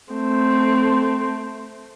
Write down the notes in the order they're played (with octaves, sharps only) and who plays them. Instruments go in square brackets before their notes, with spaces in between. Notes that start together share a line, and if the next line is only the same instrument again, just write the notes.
[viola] A3 C4